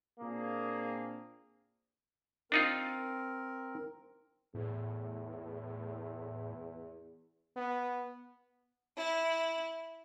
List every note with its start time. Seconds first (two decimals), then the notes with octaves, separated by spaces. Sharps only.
0.20 A#2 A#3 C4 D4 G#4
2.52 C4 D4 D#4 F4 A#4
4.55 E2 A2
7.56 B3
8.96 E4